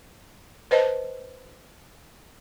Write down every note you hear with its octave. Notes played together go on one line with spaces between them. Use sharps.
B4 C5 D#5 A5